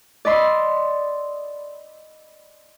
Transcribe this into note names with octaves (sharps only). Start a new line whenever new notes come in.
D5 D#5 B5 C6 E6